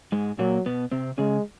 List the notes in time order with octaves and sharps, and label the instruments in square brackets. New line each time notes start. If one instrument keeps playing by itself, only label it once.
[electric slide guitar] G#2 G#3
[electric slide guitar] A#2 A#3 [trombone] F#3
[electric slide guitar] B2 B3
C3 C4
[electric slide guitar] C#3 C#4 [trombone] G#3